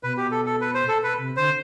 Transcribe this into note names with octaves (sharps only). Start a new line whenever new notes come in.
B2 B4
G4
A4
A4
B4
C5
A4
B4
C3
D3 C5